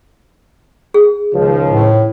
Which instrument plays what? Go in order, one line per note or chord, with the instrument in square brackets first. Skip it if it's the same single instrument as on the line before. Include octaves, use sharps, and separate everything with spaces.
[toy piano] G#4
[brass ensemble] C#2 D#3 F3
[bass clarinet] A2